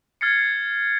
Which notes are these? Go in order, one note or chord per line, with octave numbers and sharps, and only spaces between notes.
F6 G#6 A6 C7 C#7